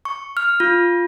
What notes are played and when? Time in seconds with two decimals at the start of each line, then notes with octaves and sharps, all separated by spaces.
0.05 C#6
0.37 F6
0.60 F4